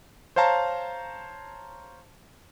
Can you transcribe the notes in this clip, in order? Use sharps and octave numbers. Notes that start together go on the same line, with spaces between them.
C5 C#5 F5 A5 A#5